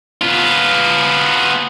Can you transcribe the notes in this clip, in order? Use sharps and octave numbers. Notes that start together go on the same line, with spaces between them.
B3 F4